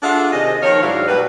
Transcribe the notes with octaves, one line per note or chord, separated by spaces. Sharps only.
D4 F4 F#4 G#4 A4 E5
C3 D#3 G#4 D#5
D#3 F3 A#3 A#4 C#5
G#2 F#3 D4 E4 F#4 F5
B2 F#3 G3 A#3 B4